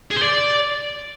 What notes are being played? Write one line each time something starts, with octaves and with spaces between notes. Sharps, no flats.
G#4
C5
D5